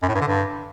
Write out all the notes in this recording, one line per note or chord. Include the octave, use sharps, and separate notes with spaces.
F#2
A2
G2
D3
G2